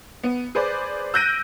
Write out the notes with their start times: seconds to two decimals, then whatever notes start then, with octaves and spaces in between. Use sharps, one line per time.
0.23 B3
0.55 G#4 B4 C5 D5
1.14 E6 F#6 G6 A#6 D7 D#7